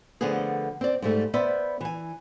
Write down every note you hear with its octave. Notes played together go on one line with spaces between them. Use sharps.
D3 F3 A3 B3 G#4
C4 D5
G#2 G3 A3
B3 B4 C5 D5 E5
E3 G#5